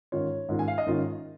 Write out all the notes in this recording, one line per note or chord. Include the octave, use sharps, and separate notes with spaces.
G#2 D#3 C#4 F4 C#5
G#2 D#3 C#4 F4
G#5
F5
D#5
G#2 D#3 C#4 F4